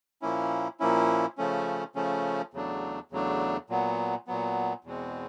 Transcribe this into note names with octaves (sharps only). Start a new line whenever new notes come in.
A#2 F3 A#3 C#4 E4
A#2 F3 A#3 C#4 E4
C#3 F3 A3 C#4
C#3 F3 A3 C#4
E2 C#3 F#3 A3 D4
E2 C#3 F#3 A3 D4
A#2 F#3 B3
A#2 F#3 B3
E2 B2 G#3 C4